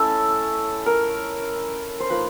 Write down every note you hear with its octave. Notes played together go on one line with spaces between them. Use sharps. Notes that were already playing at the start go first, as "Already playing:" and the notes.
Already playing: A3 C#4 E4 A4
A#4
C5
F3 A#3 D#4 B4